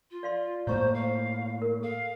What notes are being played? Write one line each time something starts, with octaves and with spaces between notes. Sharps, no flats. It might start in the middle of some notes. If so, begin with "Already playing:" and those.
F4
D5 F5 C6
A2 A3 A#3 C5 C#5 A#5 C#6
F5
A#4
A4 F5